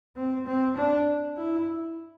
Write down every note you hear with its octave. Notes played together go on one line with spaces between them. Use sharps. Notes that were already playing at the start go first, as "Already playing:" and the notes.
C4
C4
D4
E4